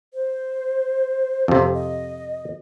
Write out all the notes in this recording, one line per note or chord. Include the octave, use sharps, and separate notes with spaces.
C5
F2 C3
D#5